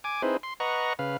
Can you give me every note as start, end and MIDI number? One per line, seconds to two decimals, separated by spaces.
0.04 0.22 80
0.04 0.22 86
0.22 0.37 60
0.22 0.37 63
0.22 0.37 64
0.22 0.37 68
0.22 0.37 71
0.22 0.37 72
0.43 0.54 84
0.60 0.93 71
0.60 0.93 75
0.60 0.93 78
0.60 0.93 82
0.60 0.93 85
0.99 1.17 49
0.99 1.17 71
0.99 1.17 77